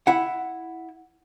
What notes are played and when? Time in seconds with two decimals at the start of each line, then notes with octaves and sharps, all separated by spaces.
0.07 E4 F#5